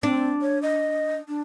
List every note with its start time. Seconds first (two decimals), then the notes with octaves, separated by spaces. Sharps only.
0.03 C4 D4
0.41 C#5
0.62 D#5
1.28 D4